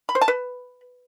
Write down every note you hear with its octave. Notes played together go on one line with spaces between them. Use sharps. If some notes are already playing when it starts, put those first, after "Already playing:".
B5
C5
A5
B4